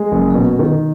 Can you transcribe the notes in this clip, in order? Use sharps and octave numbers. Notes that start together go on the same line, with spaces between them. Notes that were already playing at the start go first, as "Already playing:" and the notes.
Already playing: G#3
F#1
B2
D#3